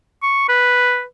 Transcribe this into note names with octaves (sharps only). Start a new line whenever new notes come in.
C#6
B4